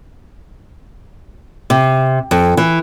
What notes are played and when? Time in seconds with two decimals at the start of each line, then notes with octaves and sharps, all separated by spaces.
1.70 C3
2.31 F2
2.57 E3